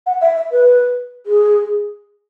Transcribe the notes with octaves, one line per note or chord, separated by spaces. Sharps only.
F#5
E5
E5
B4
G#4